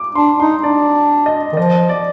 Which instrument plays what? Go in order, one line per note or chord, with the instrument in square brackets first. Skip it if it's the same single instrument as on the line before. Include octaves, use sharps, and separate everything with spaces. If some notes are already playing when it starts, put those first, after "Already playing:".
Already playing: [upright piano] D6
[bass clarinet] D4 [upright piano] C6
[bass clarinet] D#4 [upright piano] C6
[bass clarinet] D4 [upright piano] D5
[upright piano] D#5
[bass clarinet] D#3
[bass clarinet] F3 [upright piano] D#5
[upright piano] D5